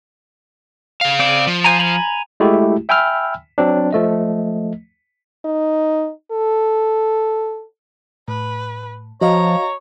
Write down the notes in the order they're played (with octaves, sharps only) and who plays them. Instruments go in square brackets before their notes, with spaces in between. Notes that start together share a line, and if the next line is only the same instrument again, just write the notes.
[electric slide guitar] C#3 F5
[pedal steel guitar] C4 D5
[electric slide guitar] F3
[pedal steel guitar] C5 G#5 A#5
G#5 A#5 B5
[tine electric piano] G#3 A3 E4 F#4 G4
E5 G5 G#5 B5 E6 F6
F#3 C4 D4
F3 A3 D#5
[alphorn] D#4
A4
[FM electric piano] A2 [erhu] B4
[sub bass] F3 [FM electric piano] F#4 D#5 F5 [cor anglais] C#5 [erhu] A#5